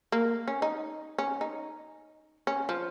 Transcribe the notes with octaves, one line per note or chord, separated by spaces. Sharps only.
A#3
C#4
D#4
C#4
D#4
C#4
F3